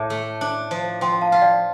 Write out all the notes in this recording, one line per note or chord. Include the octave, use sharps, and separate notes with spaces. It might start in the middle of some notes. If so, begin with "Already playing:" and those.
Already playing: A2 A5 D6
A3
D4
F3
F3 G5 C6
F5 A5
F4 F5
D5 G5